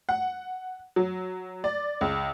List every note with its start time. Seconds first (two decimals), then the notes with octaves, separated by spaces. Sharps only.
0.09 F#5
0.96 F#3
1.64 D5
2.01 C#2